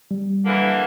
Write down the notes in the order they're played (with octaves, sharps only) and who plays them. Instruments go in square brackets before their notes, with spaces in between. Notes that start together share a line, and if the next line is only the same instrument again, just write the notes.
[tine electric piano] G3
[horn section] D3 E3 A#3